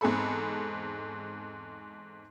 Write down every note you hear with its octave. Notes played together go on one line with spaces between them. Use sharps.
E2 G#2 C4 G#4 A4 B5